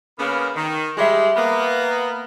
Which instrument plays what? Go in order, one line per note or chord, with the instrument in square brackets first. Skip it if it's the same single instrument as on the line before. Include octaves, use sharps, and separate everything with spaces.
[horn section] C#3 A#3 B3
D#3
[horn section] G3 G#3 [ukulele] G#4 E5
[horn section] A#3 B3